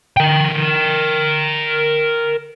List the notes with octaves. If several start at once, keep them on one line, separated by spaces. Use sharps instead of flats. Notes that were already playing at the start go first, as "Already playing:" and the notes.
A#4 G5